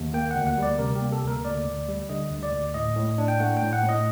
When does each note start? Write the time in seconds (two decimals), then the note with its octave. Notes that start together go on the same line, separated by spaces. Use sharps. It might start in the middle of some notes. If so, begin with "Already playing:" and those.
Already playing: D#2
0.14 A#3 G5
0.31 D2 F#5
0.47 F#5
0.58 G3 D5
0.79 C3 A#4
0.95 A#3 G4
1.12 A4
1.23 D2 A#4
1.45 D2 D5
1.66 D2
1.88 G3
2.09 D3 D#5
2.31 D2
2.43 D5
2.53 D2
2.74 A2 D#5
2.96 A2
3.18 D4
3.28 G5
3.40 A3 F#5
3.57 G5
3.62 A2
3.73 F#5
3.83 A2
3.89 D#5